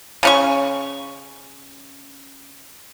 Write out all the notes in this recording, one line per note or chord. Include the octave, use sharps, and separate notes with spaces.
C#3 C#4 C#6